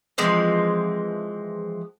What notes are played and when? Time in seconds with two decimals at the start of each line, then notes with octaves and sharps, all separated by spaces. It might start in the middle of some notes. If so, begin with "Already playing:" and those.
0.18 E3 F3 G#3 C4